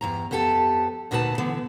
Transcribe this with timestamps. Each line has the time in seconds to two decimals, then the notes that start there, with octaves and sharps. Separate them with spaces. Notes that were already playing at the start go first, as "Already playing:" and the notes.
0.01 E2 G2 A#5
0.31 F2 B3 G4 A4 A5
1.11 D2 A#2 D#4 F#4 B4 A5
1.38 D3 E3 B3